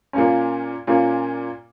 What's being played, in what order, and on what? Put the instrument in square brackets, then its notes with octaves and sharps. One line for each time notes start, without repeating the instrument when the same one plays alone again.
[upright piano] A#2 A#3 C#4
A#2 A#3 C#4